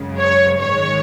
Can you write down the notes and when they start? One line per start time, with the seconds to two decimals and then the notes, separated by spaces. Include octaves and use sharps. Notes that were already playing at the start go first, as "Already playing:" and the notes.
Already playing: F#2 C#3 G#3
0.19 C#5
0.61 G#2 D#3 G#3 C#5